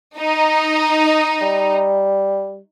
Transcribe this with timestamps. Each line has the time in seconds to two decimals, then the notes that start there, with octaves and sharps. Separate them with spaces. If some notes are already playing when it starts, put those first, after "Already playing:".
0.19 D#4
1.42 G3